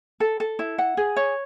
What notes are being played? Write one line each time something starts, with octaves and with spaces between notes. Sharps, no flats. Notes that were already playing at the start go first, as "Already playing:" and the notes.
A4
A4
E4
F#5
G#4
C#5